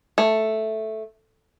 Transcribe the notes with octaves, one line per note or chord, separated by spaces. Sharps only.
A3